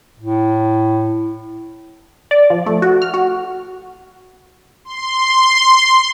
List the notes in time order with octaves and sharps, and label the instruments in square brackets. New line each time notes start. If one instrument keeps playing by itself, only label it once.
[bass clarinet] A2
[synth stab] D5
F3
A3
F#4
F6
F#4
[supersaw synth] C6